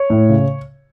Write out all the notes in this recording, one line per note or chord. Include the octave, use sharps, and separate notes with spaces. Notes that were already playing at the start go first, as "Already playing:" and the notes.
Already playing: C#5
A2
C#3